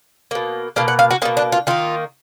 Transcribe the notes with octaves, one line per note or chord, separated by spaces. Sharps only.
B2 A#3
B2 A#3 F5
F#5
F5
F#4
B2 A#3 D#4
D4
F4
D#3 A#3 F4